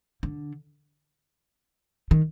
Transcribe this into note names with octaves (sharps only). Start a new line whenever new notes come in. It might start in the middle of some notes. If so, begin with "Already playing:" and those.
D3
D#3